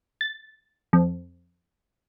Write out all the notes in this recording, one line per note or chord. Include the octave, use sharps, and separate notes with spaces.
A6
F2